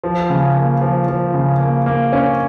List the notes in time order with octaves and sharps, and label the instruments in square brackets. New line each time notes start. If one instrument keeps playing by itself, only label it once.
[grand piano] F3
C#3
A#3
F3
F3
C#3
A#3
A#3
C#4